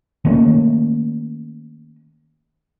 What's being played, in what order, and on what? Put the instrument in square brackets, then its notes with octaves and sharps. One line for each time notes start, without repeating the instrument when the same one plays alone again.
[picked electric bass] D#3 A3 A#3 C#4